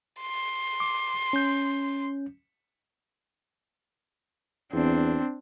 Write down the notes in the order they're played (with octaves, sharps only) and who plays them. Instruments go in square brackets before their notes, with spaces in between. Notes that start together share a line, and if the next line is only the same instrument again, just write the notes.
[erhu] C6
[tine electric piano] D6
C#4 G6
[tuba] E2 [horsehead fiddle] C4 D4